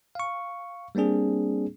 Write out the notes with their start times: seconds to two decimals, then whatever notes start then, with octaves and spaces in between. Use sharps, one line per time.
0.15 F5 C#6
0.95 G3 A#3 C4 D4 G#4